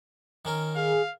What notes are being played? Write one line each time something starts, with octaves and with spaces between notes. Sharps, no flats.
D#3 C#4 A#4
G#4 F5